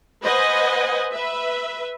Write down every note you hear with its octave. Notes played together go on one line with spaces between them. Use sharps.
B4 C5 D#5 F#5 G#5
B4 E5